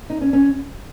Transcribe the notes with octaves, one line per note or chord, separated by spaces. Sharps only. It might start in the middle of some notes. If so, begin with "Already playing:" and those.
D#4
C#4
C#4